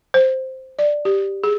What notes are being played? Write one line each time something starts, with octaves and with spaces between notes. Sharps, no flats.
C5
D5
G4
G#4